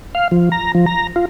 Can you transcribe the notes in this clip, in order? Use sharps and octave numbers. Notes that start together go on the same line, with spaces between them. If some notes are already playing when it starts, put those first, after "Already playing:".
F5
F3
A#5
F3
A#5
F4